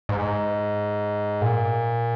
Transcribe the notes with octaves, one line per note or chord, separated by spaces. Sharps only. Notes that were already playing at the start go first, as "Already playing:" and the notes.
G#2
A#2